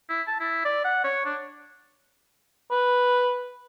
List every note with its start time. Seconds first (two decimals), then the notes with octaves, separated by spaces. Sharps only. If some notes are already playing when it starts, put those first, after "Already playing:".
0.09 E4
0.27 A5
0.40 E4
0.65 D5
0.85 F#5
1.04 C#5
1.25 D4
2.71 B4